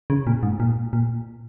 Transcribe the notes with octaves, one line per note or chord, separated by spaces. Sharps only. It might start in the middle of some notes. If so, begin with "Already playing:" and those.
C#3
A#2
G#2
A#2
A#2